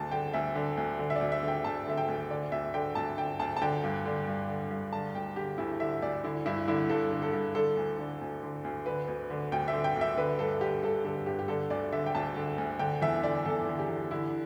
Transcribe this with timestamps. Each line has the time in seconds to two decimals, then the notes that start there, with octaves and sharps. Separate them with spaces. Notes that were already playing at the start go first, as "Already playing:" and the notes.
Already playing: D2 D3 A5
0.11 D3 G5
0.34 D2 E5
0.55 D3
0.77 D2
0.99 D3
1.10 E5
1.16 D5
1.21 D2
1.32 E5
1.43 D3
1.48 G5
1.64 D2 A5
1.87 D3 E5
1.97 G5
2.08 D2
2.30 D3 D5
2.52 D2 E5
2.74 D3 G5
2.95 D2 A5
3.18 D3 G5
3.39 D2 A5
3.56 A5
3.62 D3 G5
3.83 G2
4.06 D3
4.27 G2
4.49 D3
4.71 G2
4.93 D3 A5
5.15 D2 G5
5.36 D3 G4
5.58 D2 E4
5.80 D3 E5
6.02 D2 D5
6.24 D3 E4
6.46 G2 E4
6.68 D3 E4
6.89 G2 A4
7.12 D3
7.22 A4
7.33 G2
7.55 D3 A4
7.77 D2
7.99 D3
8.21 D2
8.43 D3
8.64 D2
8.86 D3 B4
9.08 D2
9.30 D3
9.52 D2 G5
9.68 E5
9.73 D3
9.84 G5
9.96 D2
10.01 E5
10.17 D3 B4
10.39 G2 A4
10.61 D3 G4
10.83 G2 A4
11.05 D3 A4
11.26 G2 G4
11.39 G4
11.48 D3 A4
11.70 D2 D5
11.92 D3 E5
12.06 G5
12.15 D2 A5
12.36 D3
12.58 D2
12.79 D3 G5
13.02 E2 E5
13.24 D3 D5
13.45 E2 A4
13.68 D3
13.79 G4
13.89 E2
14.11 D3 E4